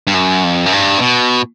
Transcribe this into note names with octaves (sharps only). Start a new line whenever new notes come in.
G2
F#2
F2
F#2
G2
C3
B2